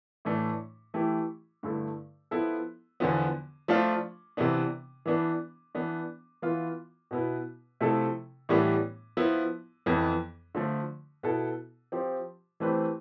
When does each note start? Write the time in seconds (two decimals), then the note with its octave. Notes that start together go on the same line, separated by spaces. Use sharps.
0.25 A2 E3 A3 D4
0.94 E3 A3 E4 G4
1.63 G2 D3 A3 E4 A4
2.31 F3 B3 E4 A4
3.00 E2 D3 F3 B3
3.68 F3 A3 D4 F4
4.37 C3 E3 B3 D4
5.06 E3 B3 D4
5.75 E3 B3 D4
6.42 E3 B3 F4
7.11 B2 B3 E4 B4
7.81 C3 F3 A3 E4 A4
8.49 A2 E3 G3 B3 D4
9.17 F3 B3 E4
9.86 F2 E3 B3
10.55 D3 F3 A3
11.23 B2 B3 E4 A4
11.92 F3 C4 G4
12.60 E3 A3 C4 G4 B4